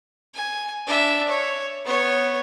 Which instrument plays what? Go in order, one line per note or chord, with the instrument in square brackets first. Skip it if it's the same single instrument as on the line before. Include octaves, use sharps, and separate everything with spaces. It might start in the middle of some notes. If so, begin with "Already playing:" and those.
[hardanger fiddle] G#5
D4 E5
C#5
B3 C#5